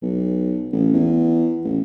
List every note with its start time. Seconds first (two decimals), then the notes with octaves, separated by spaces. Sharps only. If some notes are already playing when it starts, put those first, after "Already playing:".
0.02 B1
0.73 A1
0.93 E2
1.65 A1